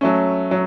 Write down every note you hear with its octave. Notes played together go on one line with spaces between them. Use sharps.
F#3 A3 C#4
F#3